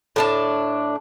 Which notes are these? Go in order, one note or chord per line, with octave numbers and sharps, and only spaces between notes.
A2 D4 A5